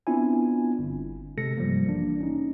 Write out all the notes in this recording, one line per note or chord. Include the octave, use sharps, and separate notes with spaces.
B3 C4 D4 E4 F4 G#5
G1
C3 G#3 A4 A#6 C#7
G2 F3 G3 A#3
A1 A#3 D4
C#4 D#4